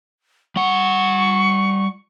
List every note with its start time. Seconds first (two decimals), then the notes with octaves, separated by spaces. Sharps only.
0.56 G3 F#5 C#6